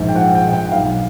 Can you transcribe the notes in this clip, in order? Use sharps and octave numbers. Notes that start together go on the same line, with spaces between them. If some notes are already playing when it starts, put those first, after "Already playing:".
Already playing: A#1 G#2
G5
F3 F#5
G5
A#1
G5
B1 F5